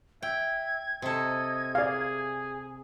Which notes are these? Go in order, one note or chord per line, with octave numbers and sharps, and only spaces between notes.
E5 G5 G#6
C3 A4 D#5 G#6
G#4 D5 F5